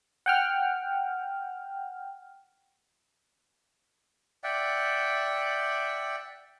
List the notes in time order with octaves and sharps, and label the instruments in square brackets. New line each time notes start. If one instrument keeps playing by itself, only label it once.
[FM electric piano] F#5 G5 F6
[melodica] D5 E5 F#5 G5